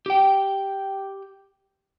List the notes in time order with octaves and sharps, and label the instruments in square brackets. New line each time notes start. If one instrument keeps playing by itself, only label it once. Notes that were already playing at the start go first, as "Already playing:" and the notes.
[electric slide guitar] G4 G5